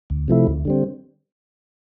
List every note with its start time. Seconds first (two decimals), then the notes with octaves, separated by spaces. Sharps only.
0.10 D2
0.28 C3 F3 A3 E4
0.47 D2
0.65 D3 G3 C4